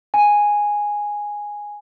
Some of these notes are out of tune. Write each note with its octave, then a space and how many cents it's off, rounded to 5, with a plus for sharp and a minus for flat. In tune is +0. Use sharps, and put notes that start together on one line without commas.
G#5 -5